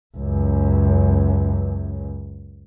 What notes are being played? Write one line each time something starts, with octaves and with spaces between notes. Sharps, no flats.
C#2 F#2